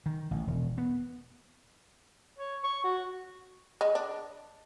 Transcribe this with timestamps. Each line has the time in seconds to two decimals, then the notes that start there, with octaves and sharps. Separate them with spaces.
0.06 D#3
0.31 A1
0.47 E1
0.78 B3
2.39 C#5
2.64 C#6
2.84 F#4
3.81 G#3
3.95 D4